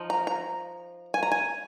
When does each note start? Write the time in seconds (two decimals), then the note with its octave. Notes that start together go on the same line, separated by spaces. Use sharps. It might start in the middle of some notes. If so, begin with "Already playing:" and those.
Already playing: F3 D#4
0.10 A#5
0.27 A#5
1.14 G#5
1.23 A#5
1.32 G#5